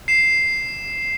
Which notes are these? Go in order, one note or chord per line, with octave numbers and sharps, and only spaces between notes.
C7 E7